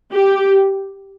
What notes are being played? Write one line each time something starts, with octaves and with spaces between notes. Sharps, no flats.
G4